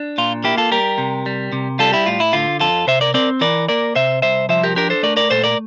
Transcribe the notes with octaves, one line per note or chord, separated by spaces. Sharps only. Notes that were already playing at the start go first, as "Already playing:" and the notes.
Already playing: D4
A#2 F4
A#3 E4 G4
F4 A4
G3 G4 A#4
C3
G3
C3
G3 F4 A4
E4 G4
A2 F4
E4
D3 F4
F2 F4 A4
C3 C5 E5
A#4 D5
C4 A#4 D5
E3 A#4 D5
A#3 A#4 D5
C3 C5 E5
C2 C5 E5
F3 C5 E5
G4 A#4
D4 G4 A#4
A4 C5
A3 A#4 D5
A#4 D5
A#2 A4 C5
A#4 D5